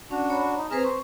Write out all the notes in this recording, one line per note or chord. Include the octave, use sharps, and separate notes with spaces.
C#4 D4 F#4
C#5 A#5 B5
D#4
C4 G#4 B4 C5 A#5 F6
C5 C#6